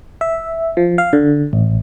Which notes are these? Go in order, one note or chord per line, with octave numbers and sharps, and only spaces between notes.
E5
F3
F5
D3
A1